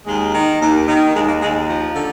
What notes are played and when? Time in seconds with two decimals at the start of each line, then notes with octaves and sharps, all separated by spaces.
0.07 D#2 G#3
0.33 D#3
0.61 D#2
0.88 D#3
1.15 D#2 G#3
1.28 A#3
1.41 D#2 G#3
1.69 F3
1.96 D3